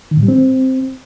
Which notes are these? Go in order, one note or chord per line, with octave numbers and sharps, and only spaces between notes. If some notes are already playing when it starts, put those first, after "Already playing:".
D#3
A2
G3
C4